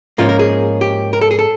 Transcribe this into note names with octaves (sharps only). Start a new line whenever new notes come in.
G#2 F3 A#3 C#4 F4
A#4
G#4
G4
A#4
A4
G#4
A4